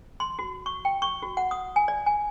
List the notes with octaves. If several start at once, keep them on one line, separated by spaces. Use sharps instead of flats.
C6
F#4
C#6
G5
C#6
F#4
F#5
D#6
G#5
D5
G#5